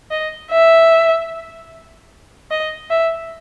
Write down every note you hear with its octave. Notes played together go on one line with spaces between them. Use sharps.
D#5
E5
D#5
E5